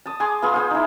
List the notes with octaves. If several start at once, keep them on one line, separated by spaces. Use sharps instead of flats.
A5 D#6
G#4 G#5 C6 D6
B3 F4 G#4 C6
F4 C5 E6
D#4 E4